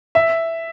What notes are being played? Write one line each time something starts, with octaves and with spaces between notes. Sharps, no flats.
E5